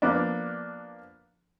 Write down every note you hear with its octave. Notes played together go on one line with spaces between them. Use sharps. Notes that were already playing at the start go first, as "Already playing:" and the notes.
F3 A#3 B3 D4